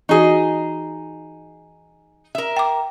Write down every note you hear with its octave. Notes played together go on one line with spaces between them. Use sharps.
E3 D#4 F#4 G#4
A#4 E5
G5 D6